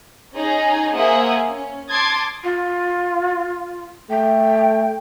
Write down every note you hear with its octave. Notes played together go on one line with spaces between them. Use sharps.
C#4 D#4 G#4 A#5
A#3 G#4 C5 E5 F#5 D#6
C#4
A5 C6 D6 D#6 G#6 A6
F4
A3 G5